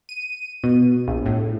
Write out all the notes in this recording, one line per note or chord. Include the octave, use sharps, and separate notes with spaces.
D#7
B2
A#1
A2